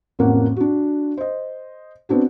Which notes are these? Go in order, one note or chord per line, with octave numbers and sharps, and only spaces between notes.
A1 F2 A#3 F#5
D4 F#4
C5 D#5
B3 C4 D4 F#4